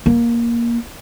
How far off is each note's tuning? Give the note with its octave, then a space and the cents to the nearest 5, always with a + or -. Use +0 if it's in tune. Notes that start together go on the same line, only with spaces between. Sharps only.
A#3 +10